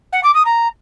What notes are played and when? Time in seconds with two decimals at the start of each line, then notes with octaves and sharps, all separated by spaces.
0.12 F#5
0.23 D6
0.34 D#6
0.45 A#5